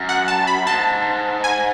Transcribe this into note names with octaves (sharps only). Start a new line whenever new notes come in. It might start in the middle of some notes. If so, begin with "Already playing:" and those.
Already playing: F#2
F#5
A5
B5
G#2 A5
G#5